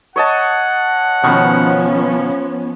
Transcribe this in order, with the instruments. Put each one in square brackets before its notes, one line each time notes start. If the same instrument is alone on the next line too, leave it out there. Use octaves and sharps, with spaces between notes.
[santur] C#5 D#5 A5 [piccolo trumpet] F#5
[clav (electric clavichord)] B2 D#3 [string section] F3 B3 C#4